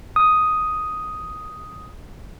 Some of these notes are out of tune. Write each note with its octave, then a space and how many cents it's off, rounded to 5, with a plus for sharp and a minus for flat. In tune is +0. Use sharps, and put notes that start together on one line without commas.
D#6 +5